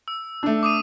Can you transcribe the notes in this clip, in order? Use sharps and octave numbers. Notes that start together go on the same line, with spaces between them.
E6
A3 D4
D6 D#6 D#7